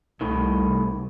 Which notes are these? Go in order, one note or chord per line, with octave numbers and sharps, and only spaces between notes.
C2 A2 D#3